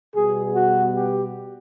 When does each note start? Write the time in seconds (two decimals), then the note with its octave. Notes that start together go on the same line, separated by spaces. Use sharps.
0.15 B2 G3 B3 G#4
0.55 F#4
0.94 G4